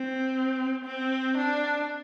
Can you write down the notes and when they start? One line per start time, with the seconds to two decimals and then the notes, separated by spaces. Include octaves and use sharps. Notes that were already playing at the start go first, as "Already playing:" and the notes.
Already playing: C4
0.85 C4
1.37 D4